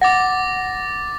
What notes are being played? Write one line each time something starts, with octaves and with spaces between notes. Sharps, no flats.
F#5 D6 A6 A#6